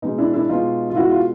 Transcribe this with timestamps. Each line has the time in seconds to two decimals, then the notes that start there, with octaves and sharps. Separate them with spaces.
0.02 B2 G#3 D#4
0.18 D4 E4
0.34 D4 E4
0.49 B2 G#3 D#4 F4
0.90 F4
0.96 B2 G#3 E4 F#4
1.10 F4